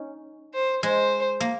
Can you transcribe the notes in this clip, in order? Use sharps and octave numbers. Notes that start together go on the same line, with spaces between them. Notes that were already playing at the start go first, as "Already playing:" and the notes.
Already playing: C#4 D#4
C5
G#3 C5
A#3